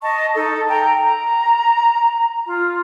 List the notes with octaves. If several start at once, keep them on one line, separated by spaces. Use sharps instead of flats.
D#5 A5 C#6
D#4 A4
G5 A#5
A#5
F4